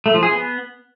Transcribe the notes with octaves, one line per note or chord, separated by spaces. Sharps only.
A3
F3
G#4
B3